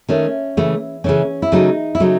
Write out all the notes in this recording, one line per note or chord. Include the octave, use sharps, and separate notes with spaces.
D#3 A3 C#4
C#3 E3 A3
C#3 E3 A3 C#4
E4
C#3 F#3 A3 D#4
E4
C#3 F#3 A3 D#4